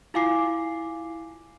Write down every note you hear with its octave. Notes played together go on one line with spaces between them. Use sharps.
E4 F4 F5 G#5 D6 C7